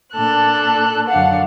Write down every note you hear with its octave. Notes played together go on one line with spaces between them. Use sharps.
A#2 D4 A4 F#6
F#2 D3 D4 F5 F#5